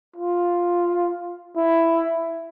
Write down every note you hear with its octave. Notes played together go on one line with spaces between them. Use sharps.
F4
E4